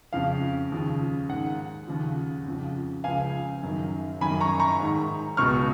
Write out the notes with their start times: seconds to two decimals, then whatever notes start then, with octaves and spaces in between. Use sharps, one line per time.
0.13 F2 C#3 F3 F5
0.72 D#2 C#3 F3
1.29 G#2 D#3 F#5
1.87 D#2 C#3 F3
2.46 F2 C#3 F3
3.04 C#2 C#3 F3 F5 G#5
3.63 F#2 D#3
4.21 F#2 D#3 G#5 B5
4.41 A#5 C#6
4.60 A#5 C#6
4.80 G#2 D#3
5.37 C#2 B2 C#6 F6